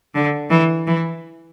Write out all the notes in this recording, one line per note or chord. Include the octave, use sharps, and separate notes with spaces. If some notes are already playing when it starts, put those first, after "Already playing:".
D3
E3
E3